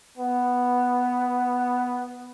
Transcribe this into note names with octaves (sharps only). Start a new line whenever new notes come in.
B3